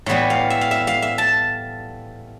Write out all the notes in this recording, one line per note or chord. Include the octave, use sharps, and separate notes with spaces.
A2 E3 G3 B3
F5
E5
F5
E5
F5
E5
A5